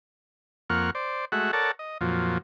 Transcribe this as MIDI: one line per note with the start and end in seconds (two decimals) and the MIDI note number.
0.70 0.90 41
0.70 0.90 58
0.70 0.90 78
0.70 0.90 85
0.70 0.90 89
0.95 1.25 72
0.95 1.25 74
1.32 1.51 56
1.32 1.51 57
1.32 1.51 66
1.32 1.51 76
1.32 1.51 78
1.53 1.71 69
1.53 1.71 70
1.53 1.71 73
1.53 1.71 74
1.53 1.71 78
1.53 1.71 81
1.79 1.98 75
2.01 2.38 41
2.01 2.38 46
2.01 2.38 53
2.01 2.38 54